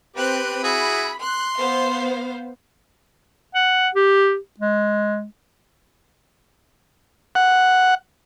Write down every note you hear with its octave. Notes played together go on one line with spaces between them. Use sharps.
C4 G4 B4 F#6
E4 F#4 G#4 B5
C6 F#6
B3 C5 F5
F#5
G4
G#3
F#5